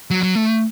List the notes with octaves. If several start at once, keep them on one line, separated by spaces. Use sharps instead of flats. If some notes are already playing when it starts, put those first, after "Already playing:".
F#3
F#3
A3